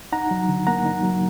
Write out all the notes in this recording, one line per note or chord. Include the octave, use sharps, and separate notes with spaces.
D#4 F#5 A#5
F#3
D3
A#3 F#5 A#5
D#4
F#3